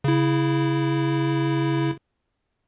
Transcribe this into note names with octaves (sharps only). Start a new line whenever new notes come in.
C#3 E4